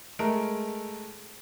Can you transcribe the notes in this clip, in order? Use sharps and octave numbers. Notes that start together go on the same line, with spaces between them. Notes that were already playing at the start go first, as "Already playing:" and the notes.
G#3 A3 A#4 D7